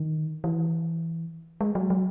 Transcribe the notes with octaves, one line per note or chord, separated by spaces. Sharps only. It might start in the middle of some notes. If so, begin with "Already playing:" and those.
Already playing: D#3
E3
G#3
F#3
F#3